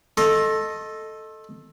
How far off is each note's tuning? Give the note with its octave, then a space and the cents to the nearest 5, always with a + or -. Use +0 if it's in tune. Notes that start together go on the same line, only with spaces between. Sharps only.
A4 +0 D#5 +0 C6 +40